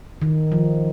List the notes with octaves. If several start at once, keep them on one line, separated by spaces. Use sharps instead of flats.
D#3
F3